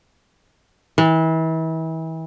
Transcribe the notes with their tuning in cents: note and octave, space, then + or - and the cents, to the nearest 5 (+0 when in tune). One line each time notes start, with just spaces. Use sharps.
E3 -35